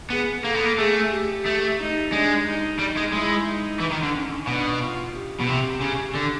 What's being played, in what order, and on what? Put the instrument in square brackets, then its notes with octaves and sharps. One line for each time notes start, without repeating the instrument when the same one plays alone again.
[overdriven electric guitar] B3 [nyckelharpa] G#4
[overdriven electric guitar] A#3 [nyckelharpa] A4
[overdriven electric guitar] B3
A#3
[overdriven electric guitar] A3 [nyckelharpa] G#4
[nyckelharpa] G4
[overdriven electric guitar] A3
[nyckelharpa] D#4
[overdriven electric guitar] G#3 [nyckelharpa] D4
[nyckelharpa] D#4
[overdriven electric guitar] G3 [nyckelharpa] D#4
[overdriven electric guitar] G#3
[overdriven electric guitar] G#3 [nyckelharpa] E4
[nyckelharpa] D#4
[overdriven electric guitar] E3
D#3
D3
[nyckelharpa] C#4
[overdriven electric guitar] B2 [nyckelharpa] D4
[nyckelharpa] F4
G4
[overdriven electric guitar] B2
C3
C#3
D3